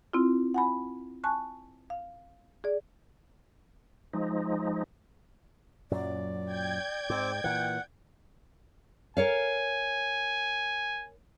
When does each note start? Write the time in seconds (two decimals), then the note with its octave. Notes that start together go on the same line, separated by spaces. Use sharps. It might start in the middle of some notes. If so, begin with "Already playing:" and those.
0.13 C4 E4 F4
0.54 F#5 G#5 B5
1.24 G#5 A5 C#6 F#6
1.90 F5
2.64 G#4 D5
4.13 F3 G#3 D#4
5.91 F#2 A#2 F#3 D5
6.45 G5 G6 G#6
7.10 G#2 C4 D6
7.44 A#2 E3 F#5
9.17 A#4 C#5 F5 G#5